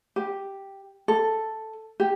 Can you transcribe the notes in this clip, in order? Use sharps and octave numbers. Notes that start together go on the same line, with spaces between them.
G4
A4
G4